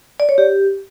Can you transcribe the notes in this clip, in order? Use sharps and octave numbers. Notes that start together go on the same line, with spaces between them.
D5
C#5
G4